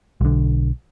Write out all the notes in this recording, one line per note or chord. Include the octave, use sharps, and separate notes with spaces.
B1 D3